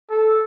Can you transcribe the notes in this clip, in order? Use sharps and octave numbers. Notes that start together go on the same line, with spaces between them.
A4